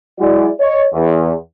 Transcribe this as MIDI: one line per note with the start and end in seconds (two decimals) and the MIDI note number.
0.19 0.48 54
0.19 0.48 56
0.19 0.48 64
0.19 0.48 66
0.19 0.48 68
0.19 0.48 74
0.60 0.84 73
0.60 0.84 75
0.94 1.33 40